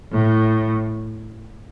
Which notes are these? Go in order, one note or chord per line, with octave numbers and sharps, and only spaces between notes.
A2